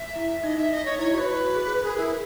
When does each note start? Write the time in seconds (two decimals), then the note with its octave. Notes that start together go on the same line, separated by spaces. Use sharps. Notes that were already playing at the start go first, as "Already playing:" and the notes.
Already playing: E5
0.16 E4
0.43 D#4 D#5
0.57 E5
0.72 D#5
0.85 C#5
0.99 E4 C#5
1.13 F#4 C#5
1.18 B4
1.55 G#4
1.83 G#4 A#4
1.98 E4